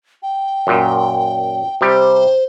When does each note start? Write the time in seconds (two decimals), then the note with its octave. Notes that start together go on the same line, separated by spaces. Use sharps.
0.23 G5
0.67 F#2 A#2
1.81 C3 G3 G4 C5